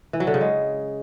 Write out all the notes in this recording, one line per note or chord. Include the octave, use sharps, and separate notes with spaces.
E3
F#3
D3
C#3
G#3